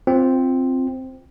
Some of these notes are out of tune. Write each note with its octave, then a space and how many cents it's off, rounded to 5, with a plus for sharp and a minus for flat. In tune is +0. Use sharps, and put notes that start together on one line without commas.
C4 +0 F4 +0